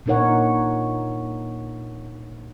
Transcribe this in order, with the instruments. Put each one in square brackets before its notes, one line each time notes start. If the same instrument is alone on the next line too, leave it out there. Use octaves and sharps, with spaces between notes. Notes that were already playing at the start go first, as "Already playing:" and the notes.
[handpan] A#2 D4 D#4 A#4 C#5 F#5